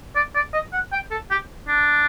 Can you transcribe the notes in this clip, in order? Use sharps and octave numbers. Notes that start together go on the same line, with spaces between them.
D5
D5
D#5
F#5
G5
A4
G4
D4